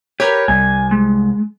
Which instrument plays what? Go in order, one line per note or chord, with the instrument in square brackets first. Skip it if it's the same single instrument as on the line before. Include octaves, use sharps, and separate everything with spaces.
[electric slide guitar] G4 [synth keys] A#4 B4 C#5
[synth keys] C2 [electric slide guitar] G#5
[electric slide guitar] G#3